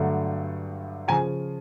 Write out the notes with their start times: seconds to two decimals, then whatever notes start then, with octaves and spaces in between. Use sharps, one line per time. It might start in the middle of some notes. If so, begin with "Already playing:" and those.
Already playing: G2 D3 F#3 A3
1.08 C#3 F3 G#5 A#5